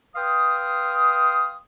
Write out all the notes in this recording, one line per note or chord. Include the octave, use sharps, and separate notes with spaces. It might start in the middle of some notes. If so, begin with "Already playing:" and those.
B4 F5 G5 C6 D#6